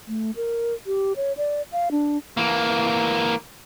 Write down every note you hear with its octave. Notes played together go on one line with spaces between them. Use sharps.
A3
A#4
G4
C#5
D5
F5
D4
E3 A#3